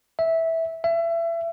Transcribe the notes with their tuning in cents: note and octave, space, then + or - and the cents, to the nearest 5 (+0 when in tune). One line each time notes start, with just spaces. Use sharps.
E5 -10
E5 +30